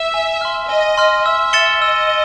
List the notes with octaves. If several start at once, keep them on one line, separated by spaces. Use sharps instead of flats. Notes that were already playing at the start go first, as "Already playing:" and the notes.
Already playing: E5
G#5
C6 F6
D#5 G#5
C6 F6
E5 E6
A6 C#7 E7 G7
D#5 E6
G7